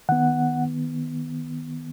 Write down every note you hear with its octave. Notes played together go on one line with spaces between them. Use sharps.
D#3 B3 F#5